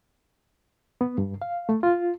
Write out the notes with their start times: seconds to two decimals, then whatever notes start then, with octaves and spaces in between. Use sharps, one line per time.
1.01 B3
1.18 G2
1.42 F5
1.69 A3
1.83 F4